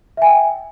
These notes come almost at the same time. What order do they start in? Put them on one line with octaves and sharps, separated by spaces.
E5 G#5 G5